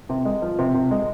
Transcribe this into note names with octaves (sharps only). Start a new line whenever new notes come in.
C3
G#3
F3
C3
C3
G#3